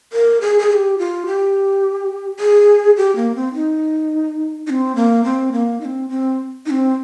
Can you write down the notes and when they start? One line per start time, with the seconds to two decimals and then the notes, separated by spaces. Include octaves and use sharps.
0.13 A#4
0.41 G#4
0.59 G#4
0.70 G#4
0.74 G4
0.99 F4
1.27 G4
2.40 G#4
2.97 G4
3.16 A#3
3.35 C4
3.54 D#4
4.67 D#4
4.70 C4
4.96 A#3
5.24 C4
5.52 A#3
5.80 D#4
5.85 C4
6.09 C4
6.66 D#4
6.71 C4